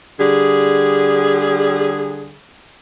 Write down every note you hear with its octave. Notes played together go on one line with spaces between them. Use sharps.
D3 G3 G#4